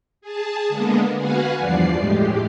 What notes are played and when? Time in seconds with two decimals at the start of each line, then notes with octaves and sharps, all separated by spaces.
0.21 G#4 A5
0.69 D3 G#3 A#3 B3
1.16 F#4 B4 F5 F#5 G#5
1.58 E2 G2 F3 D5 C7
1.94 A2 G#3 G4